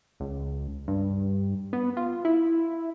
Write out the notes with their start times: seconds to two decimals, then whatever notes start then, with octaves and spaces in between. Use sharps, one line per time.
0.20 C#2
0.88 G2
1.73 B3
1.97 F4
2.25 E4